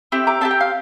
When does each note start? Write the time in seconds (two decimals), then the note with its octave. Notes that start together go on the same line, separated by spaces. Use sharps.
0.12 C4 E4 G4
0.27 A#5 D6
0.41 C4 E4 G4 A5
0.51 G5
0.61 F5